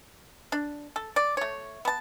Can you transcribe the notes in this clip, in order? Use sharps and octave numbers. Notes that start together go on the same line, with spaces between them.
D4
A4
D5
A3 C#5
B3 A5